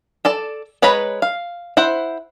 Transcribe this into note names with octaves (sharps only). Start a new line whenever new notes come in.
A4 D5 A5
G#3 B4 C#5 A#5 B5
F5
E4 C5 F#5